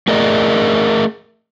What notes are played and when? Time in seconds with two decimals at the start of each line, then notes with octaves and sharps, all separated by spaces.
0.08 A3 G#4 A#4 D5 D#5